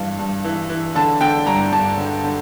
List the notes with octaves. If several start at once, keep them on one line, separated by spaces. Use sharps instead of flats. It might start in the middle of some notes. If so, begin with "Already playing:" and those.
Already playing: G2 E3 F5
G2
E3
E3
D3 A5
D3 G5
G2 A#5
G2 A5
D3
D3